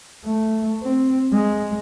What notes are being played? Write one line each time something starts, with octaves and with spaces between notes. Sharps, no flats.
A3
C4
G#3